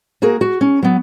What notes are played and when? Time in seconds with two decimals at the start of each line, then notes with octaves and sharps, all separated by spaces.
0.22 A#3 F#4 G#4 A#4
0.41 F#4
0.61 C#4
0.82 F#3 B3